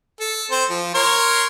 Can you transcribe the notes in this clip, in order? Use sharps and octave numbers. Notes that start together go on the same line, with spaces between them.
A4
C4 C5
F3
A#4 C#5 C6